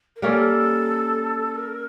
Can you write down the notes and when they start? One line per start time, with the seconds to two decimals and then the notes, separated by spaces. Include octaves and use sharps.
0.16 A#4
0.22 G3 A#3 C#4 A4
1.55 A#4